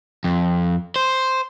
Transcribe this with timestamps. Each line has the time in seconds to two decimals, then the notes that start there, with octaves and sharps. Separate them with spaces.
0.24 F2
0.96 C5